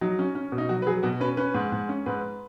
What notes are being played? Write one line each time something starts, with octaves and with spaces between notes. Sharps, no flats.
F#3 D#4
C#4
C#4
B2
D#4
F#3 F#4
B4
F#3 G#4
B2 F#4
C#4 B4
C#4 B4
G#2
G#2
C#4
G#2 B4